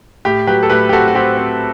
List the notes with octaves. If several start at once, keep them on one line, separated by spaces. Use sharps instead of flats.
A2 G4
F#3 G4 B4
A4
A2 G4 B4
G4
C4 F#4 A4
F#4
C4 G4
C4